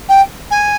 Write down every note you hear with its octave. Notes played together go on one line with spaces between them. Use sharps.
G5
G#5